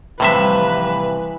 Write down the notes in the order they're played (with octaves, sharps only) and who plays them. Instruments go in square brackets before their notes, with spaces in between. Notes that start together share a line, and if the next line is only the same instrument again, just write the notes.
[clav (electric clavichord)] A2 C3 E5 [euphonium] E3 [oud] F3 G3 [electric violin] B4